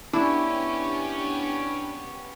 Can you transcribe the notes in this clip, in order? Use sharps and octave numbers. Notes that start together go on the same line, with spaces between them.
B3 C#4 D4 E4 G4